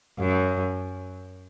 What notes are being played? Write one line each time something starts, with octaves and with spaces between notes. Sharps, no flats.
F#2